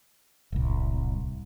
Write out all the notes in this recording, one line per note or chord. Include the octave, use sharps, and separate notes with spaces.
D1 C2